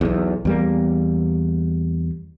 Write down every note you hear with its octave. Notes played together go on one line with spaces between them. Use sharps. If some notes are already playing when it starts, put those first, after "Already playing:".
B1 E2
E2 G3 A#3